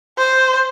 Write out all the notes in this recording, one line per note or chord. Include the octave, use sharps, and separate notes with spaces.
C5